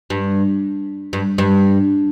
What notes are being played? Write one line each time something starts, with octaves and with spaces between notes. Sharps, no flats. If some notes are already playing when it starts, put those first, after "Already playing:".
G2
G2
G2